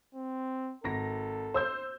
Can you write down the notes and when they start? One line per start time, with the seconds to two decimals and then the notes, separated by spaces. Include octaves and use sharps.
0.15 C4
0.84 G#1 A4 A#6
1.54 C5 E6 G6